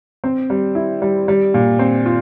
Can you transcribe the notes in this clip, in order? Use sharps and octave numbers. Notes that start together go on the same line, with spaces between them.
C4
G3
E4
G3
G3
A#2
C4
F4